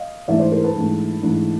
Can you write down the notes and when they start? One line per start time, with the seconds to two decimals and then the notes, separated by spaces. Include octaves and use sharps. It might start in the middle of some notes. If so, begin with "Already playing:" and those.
Already playing: D#5 F5
0.28 G#2 E3 A3 D4 D5 E5
0.39 C5 D5
0.52 A#4 C5
0.64 A4 B4
0.76 G#2 E3 A3 D4
1.23 G#2 E3 A3 D4